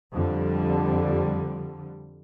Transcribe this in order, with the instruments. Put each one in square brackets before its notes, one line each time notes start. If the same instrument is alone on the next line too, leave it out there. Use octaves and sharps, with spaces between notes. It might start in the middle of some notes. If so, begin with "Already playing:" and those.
[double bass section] F2 D3 G3